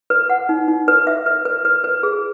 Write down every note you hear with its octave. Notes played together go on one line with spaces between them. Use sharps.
B4
F#5
D#4
D#4
B4
E5
B4
B4
B4
B4
G#4